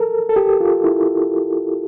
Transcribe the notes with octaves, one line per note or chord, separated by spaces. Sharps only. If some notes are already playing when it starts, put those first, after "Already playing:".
Already playing: A4 A#4
A4
G4
F4
E4